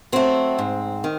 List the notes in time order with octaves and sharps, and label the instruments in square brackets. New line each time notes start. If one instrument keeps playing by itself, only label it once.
[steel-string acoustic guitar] F#3 A3 C4
G#2
D#3